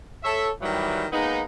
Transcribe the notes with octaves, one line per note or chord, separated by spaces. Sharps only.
A4 C#5 E5
D#3 E3 F#3 G3
G#3 A#3 B3 D#4